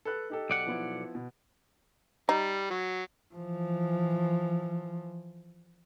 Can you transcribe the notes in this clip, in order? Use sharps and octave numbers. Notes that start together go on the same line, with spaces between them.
A4 B4 F#6
D#4 G4 A4
B1 D5 F#5
F3 B3 E4
B2
G3 D#4
F#3
E3 F3